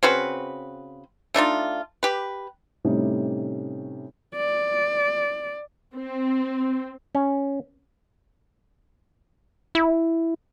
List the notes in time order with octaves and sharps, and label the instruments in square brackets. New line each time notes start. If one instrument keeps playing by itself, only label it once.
[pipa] C#3 C4 F#4 B4
A3 D4 D#4 F4
G4 B4
[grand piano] A2 C3 G3 C#4 D#4
[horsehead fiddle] D5
[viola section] C4
[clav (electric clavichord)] C#4
[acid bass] E4